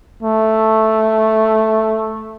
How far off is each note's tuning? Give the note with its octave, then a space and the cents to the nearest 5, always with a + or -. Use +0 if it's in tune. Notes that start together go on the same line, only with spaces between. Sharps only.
A3 +0